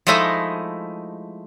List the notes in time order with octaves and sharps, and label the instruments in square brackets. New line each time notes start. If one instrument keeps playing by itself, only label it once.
[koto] F3 G#3 A3 D#4 E4 D#5